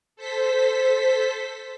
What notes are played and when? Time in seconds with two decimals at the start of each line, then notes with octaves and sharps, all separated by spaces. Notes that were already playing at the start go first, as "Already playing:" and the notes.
0.16 A4 C5 B6